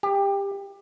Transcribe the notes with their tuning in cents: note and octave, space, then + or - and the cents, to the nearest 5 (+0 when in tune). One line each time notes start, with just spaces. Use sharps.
G4 +20